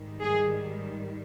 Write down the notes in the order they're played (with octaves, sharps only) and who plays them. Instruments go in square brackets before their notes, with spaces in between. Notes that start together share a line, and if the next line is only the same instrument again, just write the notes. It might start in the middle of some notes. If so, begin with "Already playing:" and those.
Already playing: [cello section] G#2 D#3 G3
G#4